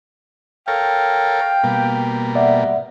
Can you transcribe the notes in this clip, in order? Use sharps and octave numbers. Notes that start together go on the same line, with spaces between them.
A4 A#4 C#5 F5 G5
B2 G3 A#3
D5 E5 F#5